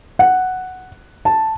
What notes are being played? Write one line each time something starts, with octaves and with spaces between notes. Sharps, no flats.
F#5
A5